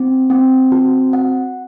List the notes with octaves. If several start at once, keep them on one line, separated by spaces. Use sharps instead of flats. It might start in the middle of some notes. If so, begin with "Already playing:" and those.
Already playing: C4
C4
F#4
F#5